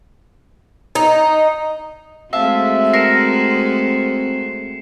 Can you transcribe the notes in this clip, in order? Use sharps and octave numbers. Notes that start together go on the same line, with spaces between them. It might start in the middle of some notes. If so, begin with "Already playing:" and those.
D#4
G#3 A3 C4 F#4 E5 F5 A5
A#4 C7 C#7 E7